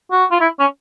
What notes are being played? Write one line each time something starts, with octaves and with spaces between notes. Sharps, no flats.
F#4
F4
E4
C#4